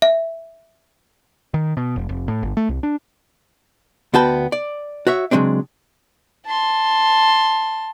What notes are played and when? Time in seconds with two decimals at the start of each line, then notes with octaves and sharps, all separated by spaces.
0.02 E5
1.54 D#3
1.77 B2
1.96 F1
2.09 F1
2.28 A2
2.43 G1
2.57 A3
2.69 C2
2.83 D4
4.14 D2 B3 F#4 G5 A5 B5
4.52 D5
5.07 F#4 C#5 E5
5.31 C#3 F#3 G#3 C4 D4
6.46 A5 C6